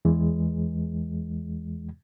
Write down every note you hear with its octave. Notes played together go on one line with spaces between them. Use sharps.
E2 E3 G#3